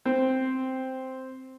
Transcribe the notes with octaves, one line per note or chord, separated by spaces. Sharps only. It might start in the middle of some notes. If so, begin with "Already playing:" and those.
C4